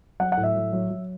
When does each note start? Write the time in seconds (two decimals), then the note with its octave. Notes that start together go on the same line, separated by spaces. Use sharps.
0.20 F#3 F#5
0.32 F#5
0.37 A2
0.43 E5
0.55 F#3
0.73 F#3
0.90 F#3